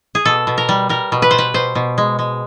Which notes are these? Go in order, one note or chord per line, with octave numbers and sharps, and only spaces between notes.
G#4
B2 A4
B2
A#4
G3
G3 A#4
B2
B4
B2 C5
B4
B2 C5
B2
G#3
G#3